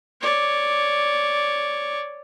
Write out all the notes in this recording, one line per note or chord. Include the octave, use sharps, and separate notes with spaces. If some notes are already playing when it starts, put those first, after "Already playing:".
C#5 D5